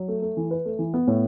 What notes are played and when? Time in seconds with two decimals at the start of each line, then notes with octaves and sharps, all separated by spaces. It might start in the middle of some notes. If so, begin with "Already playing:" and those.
Already playing: F#3
0.08 A3
0.22 A3
0.37 E3
0.51 B4
0.65 A3
0.79 E3
0.94 B3
1.07 A2